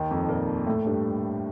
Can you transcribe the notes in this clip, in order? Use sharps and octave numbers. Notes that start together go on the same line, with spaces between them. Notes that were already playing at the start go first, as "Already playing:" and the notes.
Already playing: D#2 D#3
F2 F3
A#2 A#3
A2 A3
G2 G3